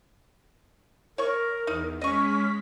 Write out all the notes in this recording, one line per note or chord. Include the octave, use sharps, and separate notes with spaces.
A#4 C#5 C#6
E2 D#4
G#3 C#4 D#5 C#6 B6